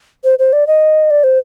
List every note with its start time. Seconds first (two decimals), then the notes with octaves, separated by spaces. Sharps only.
0.24 C5
0.39 C5
0.53 D5
0.67 D#5
1.11 D5
1.24 C5